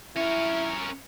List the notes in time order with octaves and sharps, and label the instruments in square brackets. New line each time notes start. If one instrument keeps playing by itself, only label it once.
[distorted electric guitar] C#4 A#4 [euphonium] E4